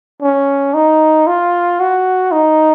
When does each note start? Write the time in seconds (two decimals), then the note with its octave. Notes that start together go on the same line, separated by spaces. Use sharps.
0.22 C#4
0.74 D#4
1.27 F4
1.80 F#4
2.32 D#4